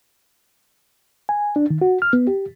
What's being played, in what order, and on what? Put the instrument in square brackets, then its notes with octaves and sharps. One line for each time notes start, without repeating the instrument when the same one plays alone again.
[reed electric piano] G#5
D4
D#3
F#4
F6
B3
G4